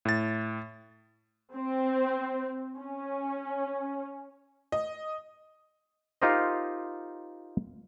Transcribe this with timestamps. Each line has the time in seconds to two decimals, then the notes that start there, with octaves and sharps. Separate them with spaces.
0.05 A2 A6
1.55 C4
2.78 C#4
4.72 D#5
6.22 D#4 F4 G4 A#4 C5 D#5